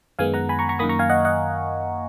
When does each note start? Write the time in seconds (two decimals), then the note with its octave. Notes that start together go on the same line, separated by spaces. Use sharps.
0.19 F#2 D#3 G#3 B3 F5 G#5
0.34 F#5 A#5
0.49 G#5 B5
0.59 A#5 C#6
0.69 A#5 C#6
0.79 F#2 D#3 A#3 B5 D#6
0.89 A#5 C#6
0.99 F5 G#5
1.09 D#5 F#5
1.25 D#5 F#5